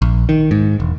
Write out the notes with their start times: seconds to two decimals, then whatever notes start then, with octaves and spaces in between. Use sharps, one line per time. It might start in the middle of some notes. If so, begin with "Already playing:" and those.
0.02 A#1
0.29 D#3
0.51 G#2
0.80 E1